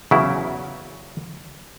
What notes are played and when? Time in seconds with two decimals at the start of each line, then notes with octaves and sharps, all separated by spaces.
0.11 E2 C#3 F#3 E4